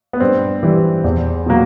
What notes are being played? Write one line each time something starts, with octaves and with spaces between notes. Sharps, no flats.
B3
G2 C4
E3 G3
E2
B2 F#3 A#3